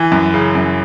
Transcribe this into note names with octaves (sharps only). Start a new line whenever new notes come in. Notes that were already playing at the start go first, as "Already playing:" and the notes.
Already playing: E3
F#2
C#3
F#2